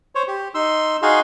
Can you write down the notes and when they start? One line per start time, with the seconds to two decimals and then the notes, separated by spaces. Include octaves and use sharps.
0.15 C5 C#5
0.28 G4
0.55 D#4 C6 E6
1.02 D#4 F#4 G#4 F5 C6